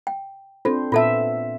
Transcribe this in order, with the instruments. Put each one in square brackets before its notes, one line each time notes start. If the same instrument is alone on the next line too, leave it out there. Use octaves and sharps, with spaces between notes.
[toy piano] G5
[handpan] C4 D4 C5 [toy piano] F4 A4
[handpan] A#2 B3 E5 [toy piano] F4 A4 A5